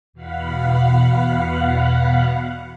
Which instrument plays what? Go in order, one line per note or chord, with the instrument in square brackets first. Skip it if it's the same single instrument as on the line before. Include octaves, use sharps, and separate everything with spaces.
[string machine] E2 B2 F5 F#5 B5